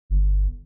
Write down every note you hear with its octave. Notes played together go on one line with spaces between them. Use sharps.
G1